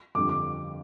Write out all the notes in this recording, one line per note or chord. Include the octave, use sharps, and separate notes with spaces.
F2 D3 G3 D6
D6